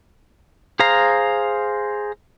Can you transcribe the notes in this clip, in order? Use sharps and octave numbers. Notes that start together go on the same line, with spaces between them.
G#4 C5 F5 A#5